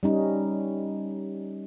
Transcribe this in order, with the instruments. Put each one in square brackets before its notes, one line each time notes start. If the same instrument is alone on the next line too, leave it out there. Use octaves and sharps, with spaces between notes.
[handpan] G3 C#4 D#4